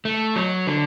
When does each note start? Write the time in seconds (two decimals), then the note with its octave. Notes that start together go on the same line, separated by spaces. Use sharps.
0.05 A3
0.36 F#3
0.67 D3